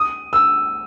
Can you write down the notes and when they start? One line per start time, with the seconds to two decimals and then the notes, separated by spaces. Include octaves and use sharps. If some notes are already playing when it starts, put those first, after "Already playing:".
Already playing: D#6
0.33 E6